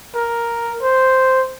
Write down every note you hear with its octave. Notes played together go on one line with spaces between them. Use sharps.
A#4
C5